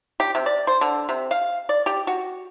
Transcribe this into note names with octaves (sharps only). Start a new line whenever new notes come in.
G4
C3
D5
C5
D3
C3
F5
D5
G4
F#4